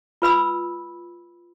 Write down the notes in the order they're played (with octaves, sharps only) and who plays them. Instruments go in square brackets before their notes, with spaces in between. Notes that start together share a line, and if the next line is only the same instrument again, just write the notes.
[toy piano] F4 B4 B5 E6